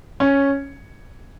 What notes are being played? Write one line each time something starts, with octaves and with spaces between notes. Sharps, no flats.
C#4